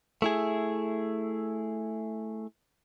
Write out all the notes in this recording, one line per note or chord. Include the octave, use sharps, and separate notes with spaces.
A3 E4 G#4